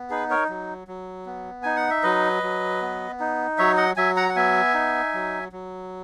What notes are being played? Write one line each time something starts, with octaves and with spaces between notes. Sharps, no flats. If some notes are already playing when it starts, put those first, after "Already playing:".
Already playing: B3
D#4 G#4 B4
A#4 C#5
F#3
F#3
B3
D#4 G#5
F#5
E5
F#3 B4 D#5
F#3
B3
D#4
F#3 C#5 E5
D#5 F#5
F#3 E5 G#5
F#5 A#5
F#5
B3 E5 G#5
D#4
F#3
F#3